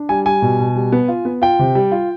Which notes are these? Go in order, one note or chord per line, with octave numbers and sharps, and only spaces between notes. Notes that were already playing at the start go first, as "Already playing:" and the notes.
Already playing: D4
G3 G#5
G3 G#5
B2
B2
G3
B3
F4
B3
F4 G5
C3
G3
F4